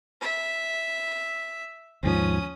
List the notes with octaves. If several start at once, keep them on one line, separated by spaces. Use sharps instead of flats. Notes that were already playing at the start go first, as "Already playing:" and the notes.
E5
D#2 G#2 F3 C#4 D#6